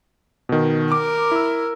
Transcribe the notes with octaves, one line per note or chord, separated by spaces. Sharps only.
B2 D#3
A#4 D6
E4 E6